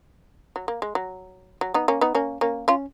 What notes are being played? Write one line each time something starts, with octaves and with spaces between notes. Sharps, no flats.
F#3
A#3
G#3
F#3
F#3
B3 D#4
A#3 C#4
B3 D#4
A#3 C#4
A#3 C#4
C#4 F4